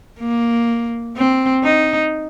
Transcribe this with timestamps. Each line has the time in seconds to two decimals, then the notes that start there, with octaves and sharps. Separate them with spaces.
0.20 A#3
1.17 C4
1.63 D#4